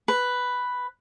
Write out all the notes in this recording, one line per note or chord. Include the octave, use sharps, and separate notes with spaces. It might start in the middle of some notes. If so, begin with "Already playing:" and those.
B4